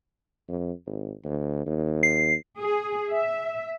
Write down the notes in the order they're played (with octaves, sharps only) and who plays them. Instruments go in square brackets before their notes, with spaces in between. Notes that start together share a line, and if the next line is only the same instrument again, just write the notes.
[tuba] F2
G#1
D2
D#2
[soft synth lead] C7
[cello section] G#4
E5